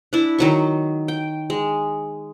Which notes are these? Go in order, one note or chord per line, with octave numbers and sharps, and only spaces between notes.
D4 E4
D#3 F#3 C#6
G5
G#3